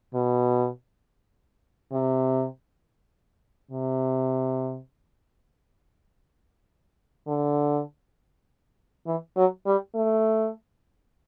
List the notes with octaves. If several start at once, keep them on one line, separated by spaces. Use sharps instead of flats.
B2
C3
C3
D3
E3
F#3
G3
A3